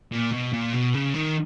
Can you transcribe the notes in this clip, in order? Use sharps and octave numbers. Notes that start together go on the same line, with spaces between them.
A#2
B2
A#2
B2
C#3
D#3